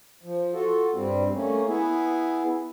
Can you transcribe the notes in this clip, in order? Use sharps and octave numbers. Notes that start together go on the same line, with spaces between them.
F3
F4 F#4 A4
G2 G3 C4
A3 A#3 C#4
B3 E4 G#4